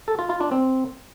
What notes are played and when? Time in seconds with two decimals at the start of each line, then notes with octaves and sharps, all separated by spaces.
0.08 A4
0.19 F4
0.30 F4
0.41 D4
0.51 C4